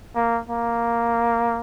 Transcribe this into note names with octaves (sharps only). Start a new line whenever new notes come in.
A#3
A#3